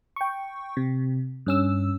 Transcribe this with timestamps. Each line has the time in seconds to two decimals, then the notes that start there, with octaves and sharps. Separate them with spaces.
0.16 G5 C#6
0.77 C3
1.46 G2 C#4 E6